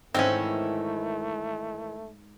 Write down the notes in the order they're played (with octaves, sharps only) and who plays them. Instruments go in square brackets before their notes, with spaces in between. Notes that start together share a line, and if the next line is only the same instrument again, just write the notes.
[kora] G#2 [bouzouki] D#3 E3 E4 [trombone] A3 [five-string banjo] C4 C#4